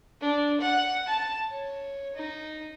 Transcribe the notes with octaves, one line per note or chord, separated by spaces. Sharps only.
D4
F#5
A5
C#5
D#4